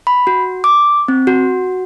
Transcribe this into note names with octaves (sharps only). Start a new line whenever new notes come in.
B5
F#4
D6
C4
F#4